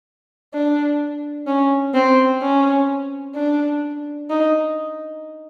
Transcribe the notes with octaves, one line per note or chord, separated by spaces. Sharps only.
D4
C#4
C4
C#4
D4
D#4